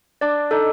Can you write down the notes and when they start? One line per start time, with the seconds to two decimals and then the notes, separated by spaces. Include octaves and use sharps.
0.21 D4 D5
0.51 D#4 A4